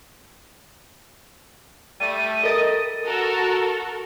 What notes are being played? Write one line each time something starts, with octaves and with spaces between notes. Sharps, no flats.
G3 A3 D#7
A4 A#4 D#5 A6
F#4 A4 A#4